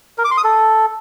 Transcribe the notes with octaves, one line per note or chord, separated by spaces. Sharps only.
A#4
D6
C6
D#6
A4